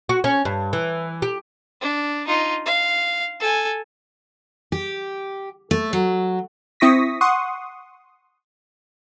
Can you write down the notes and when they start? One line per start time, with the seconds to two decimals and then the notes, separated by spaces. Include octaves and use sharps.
0.09 F#4
0.24 C#4
0.45 G2
0.73 E3
1.22 G4
1.81 D4
2.27 D#4 F4
2.66 F5
3.40 A4 G#5
4.72 G4
5.71 A3
5.93 F#3
6.80 C4 E4 C#6 D#6 A#6 B6
7.21 F#5 C6 C#6 D#6